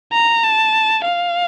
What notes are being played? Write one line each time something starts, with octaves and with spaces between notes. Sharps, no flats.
A#5
A5
F5